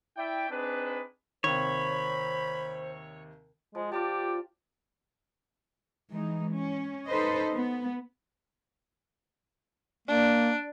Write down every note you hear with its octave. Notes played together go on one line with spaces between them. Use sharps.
E4 D5 E5 G5
C4 D4 D#4 G#4 B4
D#2 C3 C5 C#5 B5
F3 G#3
F4 G4 D5 A5
E3 G#3 D#4
C#4
D#4 A4 B4 C5 D#5
B3
A#3 D4